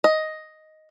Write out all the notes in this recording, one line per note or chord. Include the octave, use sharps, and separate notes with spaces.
D#5